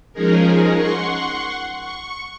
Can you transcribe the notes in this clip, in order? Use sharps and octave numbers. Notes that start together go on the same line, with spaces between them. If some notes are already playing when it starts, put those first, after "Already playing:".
F3 G#3 C#4 D#4 G#4 A#4
F#5 C6 C#6
C#6